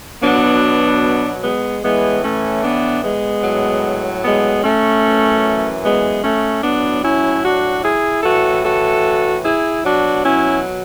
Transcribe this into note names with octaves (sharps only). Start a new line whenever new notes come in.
B2 F#3 B3 D4
G#3 B3
A2 E3 G#3 B3
A3 C#4
B3 D4
G#3 B3
A2 F#3
G#3 B3
A3 C#4
F#2 E3
G#3 B3
A3 C#4
A2 F#3 B3 D4
C#4 E4
D4 F#4
E4 G#4
A2 E3 F#4 A4
F#4 A4
E4 G#4
B2 F#3 D4 F#4
C#4 E4